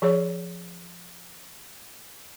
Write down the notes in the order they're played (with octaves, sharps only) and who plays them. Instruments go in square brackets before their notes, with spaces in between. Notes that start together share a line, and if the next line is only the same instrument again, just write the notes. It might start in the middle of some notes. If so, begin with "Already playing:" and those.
[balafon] F3 G#4 C#5